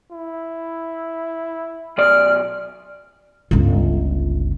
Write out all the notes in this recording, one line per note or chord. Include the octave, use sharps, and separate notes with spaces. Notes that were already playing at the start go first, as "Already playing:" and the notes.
E4
B1 D5 F6
G1 C#2